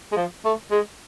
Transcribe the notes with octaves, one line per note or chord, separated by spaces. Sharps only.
G#3
F3
A3
G#3